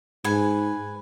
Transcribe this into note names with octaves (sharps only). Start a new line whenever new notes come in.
G#2 B4 G#5